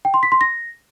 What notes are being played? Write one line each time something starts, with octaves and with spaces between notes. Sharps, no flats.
G5
C6
B6
C6
A#6